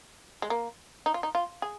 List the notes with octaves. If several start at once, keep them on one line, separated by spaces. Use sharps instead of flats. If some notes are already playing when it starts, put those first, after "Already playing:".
G#3
A#3
D#4
F4
D#4
F4
G#4